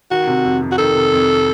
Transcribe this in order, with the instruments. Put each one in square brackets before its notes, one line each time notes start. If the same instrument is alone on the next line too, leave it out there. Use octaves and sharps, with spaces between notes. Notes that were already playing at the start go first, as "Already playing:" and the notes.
[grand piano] D#3 [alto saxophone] F#4
[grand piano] C3
F2
F2
[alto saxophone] F#4
[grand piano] D#3 [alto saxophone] A4
[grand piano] C3
F2